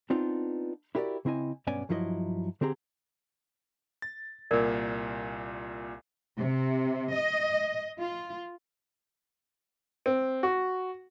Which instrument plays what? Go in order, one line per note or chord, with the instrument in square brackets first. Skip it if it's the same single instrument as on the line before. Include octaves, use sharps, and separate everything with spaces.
[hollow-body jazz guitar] B3 C4 D4 D#4 F4
E4 F#4 G4 A#4 B4 D5
C#3 C4 E4 D#5 G#5
B1 G2 B3 C#4 D5 G#5
G2 F3 F#3 E4 A4 D#5
D3 C4 G4 G#4 A#5
[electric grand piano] A6
[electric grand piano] C2 A#2 [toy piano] A#4 D5
[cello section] C3
D#5
F4
[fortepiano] C4
F#4